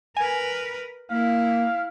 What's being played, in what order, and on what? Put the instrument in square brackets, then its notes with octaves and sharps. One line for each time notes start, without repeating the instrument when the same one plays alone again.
[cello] A#4 B4 [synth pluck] G#5
[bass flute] A#3 [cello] E4 [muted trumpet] F5